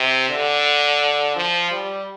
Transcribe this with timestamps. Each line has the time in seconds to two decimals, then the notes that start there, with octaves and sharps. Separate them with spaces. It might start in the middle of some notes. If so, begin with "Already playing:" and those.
Already playing: C3
0.29 D3
1.36 F3
1.71 G3